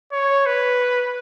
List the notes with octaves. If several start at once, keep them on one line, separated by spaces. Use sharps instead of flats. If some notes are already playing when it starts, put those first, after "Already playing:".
C#5
B4